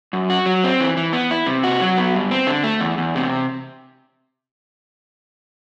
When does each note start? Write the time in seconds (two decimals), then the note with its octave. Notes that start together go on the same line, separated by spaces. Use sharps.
0.13 F#2
0.30 F#4
0.46 F#3
0.64 C4
0.80 E3
0.97 E3
1.13 B3
1.31 E4
1.47 C3
1.63 F#4
1.81 F#3
1.97 B3
2.15 G2
2.31 C4
2.47 D3
2.64 A3
2.81 E2
2.98 E2
3.15 C3